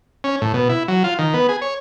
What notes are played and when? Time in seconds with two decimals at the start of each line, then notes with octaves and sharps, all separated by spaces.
0.24 C#4
0.42 A2
0.54 B2
0.69 E4
0.88 F#3
1.04 F4
1.19 D#3
1.34 B3
1.49 G#4
1.62 C#5